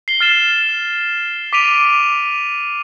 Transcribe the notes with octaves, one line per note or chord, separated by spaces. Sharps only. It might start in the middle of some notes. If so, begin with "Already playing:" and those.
C7 G7
F6 A6 E7
D6 B6 D7 D#7 F7